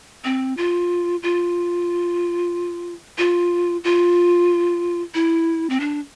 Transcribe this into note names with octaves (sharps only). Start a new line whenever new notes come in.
C4
F4
F4
F4
F4
E4
C4
D4